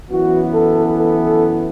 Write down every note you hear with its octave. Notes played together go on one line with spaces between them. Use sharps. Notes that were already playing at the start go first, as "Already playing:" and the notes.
F#2 E3 B3 F#4
A4
A4
A4